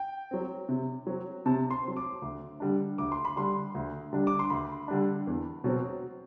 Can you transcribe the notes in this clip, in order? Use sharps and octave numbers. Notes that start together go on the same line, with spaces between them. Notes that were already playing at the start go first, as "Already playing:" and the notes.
Already playing: G5
F#3 C4
C3
F#3 C4
C3 A5
C6
F#3 C4
D6
D2
D3 G3 D4
D2 D6
C6
B5
D3 G3 D4 C6
D2
D3 G3 D4
D6
C6
D2 B5
D3 G3 D4
E2
B2 F#3 C4